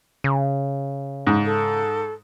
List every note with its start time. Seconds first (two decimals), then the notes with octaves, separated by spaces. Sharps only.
0.24 C#3
1.27 G#2
1.45 A4